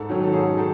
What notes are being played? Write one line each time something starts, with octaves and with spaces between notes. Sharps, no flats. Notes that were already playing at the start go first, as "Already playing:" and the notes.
Already playing: G#2 A4
D#3 F#3 C#4
A4
G#2 G#4
D#3 A4